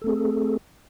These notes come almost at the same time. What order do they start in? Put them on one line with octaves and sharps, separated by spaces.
A4 A3 C4 G#4